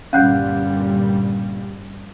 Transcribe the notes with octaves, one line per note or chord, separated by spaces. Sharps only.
G1 A#2 G3 C#4 F5 F#5 F#6 G6